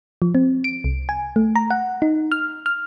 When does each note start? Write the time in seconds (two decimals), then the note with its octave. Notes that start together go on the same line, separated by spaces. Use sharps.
0.22 F3
0.35 C4
0.64 D7
0.84 C2
1.09 G#5
1.36 A3
1.56 A#5
1.70 F#5
2.02 D#4
2.32 F6
2.66 F6